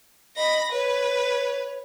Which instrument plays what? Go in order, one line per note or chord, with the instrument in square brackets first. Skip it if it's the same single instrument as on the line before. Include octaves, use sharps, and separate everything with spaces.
[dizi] D#5 [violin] B5 A#6
[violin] B4 [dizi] C#5